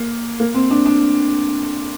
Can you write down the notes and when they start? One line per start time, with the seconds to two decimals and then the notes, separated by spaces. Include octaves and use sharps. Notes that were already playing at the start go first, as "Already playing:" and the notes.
Already playing: A#3
0.40 A#3
0.54 C4
0.71 D4
0.86 D4